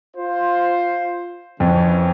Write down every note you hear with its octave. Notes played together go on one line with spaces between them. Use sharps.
F4 C5
F2 C#3 E3 C#4